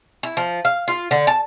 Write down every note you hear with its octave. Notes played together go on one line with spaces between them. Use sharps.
E4
F3
F5
F4
D3
A5